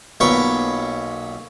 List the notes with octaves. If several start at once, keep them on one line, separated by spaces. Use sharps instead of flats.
B1 A#2 B4 C#5 G5 C#6